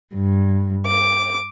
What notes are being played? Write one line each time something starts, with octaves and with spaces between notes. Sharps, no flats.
G2
D6